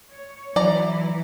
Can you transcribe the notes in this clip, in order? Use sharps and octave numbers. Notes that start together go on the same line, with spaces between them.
C#5
E3 F#3 D5 A#5